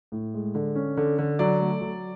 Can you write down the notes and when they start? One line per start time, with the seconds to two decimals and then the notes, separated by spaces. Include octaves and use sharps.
0.12 A2
0.34 G#3
0.55 D3
0.75 C#4
0.97 D3
1.19 D3
1.39 F#3 D5
1.60 A3
1.81 F#3